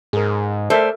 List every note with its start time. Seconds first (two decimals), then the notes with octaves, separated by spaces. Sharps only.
0.13 G#2 G#4 A#4
0.70 A3 A4 A#4 C5 D5 E5